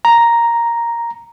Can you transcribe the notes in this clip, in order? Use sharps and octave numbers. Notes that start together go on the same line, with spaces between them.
A#5